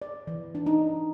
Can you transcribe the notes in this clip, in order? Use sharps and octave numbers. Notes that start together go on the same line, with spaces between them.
D5
E3
D4
D#4